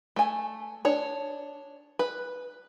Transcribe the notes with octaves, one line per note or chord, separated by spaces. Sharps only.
A3 G#5
D4 C#5
B4